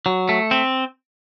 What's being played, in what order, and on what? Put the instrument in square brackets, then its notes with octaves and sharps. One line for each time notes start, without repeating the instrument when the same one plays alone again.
[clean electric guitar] F#3
A3
C4